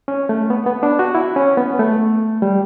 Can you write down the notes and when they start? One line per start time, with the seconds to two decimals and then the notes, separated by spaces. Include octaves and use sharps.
0.08 C#4
0.29 A3
0.50 B3
0.66 B3
0.83 D4
0.99 F#4
1.15 E4
1.36 C#4
1.57 B3
1.79 A3
2.42 G3